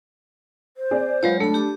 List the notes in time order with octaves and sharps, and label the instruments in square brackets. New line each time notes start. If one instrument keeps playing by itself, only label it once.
[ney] C5
[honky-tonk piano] C4 G#4 D5
[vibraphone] F#3 G#3 C#5 [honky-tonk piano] F4 B4
[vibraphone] A3 B5 [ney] D4 [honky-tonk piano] A4
[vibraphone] G4 D6